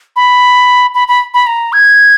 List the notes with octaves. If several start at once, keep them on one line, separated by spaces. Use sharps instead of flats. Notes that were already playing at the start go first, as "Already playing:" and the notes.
B5
B5
B5
B5
A#5
G#6